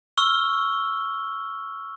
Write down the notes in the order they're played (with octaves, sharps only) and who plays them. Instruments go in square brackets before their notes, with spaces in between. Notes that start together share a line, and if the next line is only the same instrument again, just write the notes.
[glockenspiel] C#6 E6 F6 G7